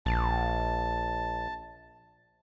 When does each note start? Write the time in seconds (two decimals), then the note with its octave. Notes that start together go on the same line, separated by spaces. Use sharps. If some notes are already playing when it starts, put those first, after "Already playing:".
0.06 A#1 A5